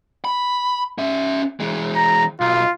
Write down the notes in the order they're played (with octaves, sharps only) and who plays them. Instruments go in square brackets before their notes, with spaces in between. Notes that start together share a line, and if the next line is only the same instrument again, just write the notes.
[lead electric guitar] B5
C#4 E5
E3 G#3
[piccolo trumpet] A#5
[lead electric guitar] B1 [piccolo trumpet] F4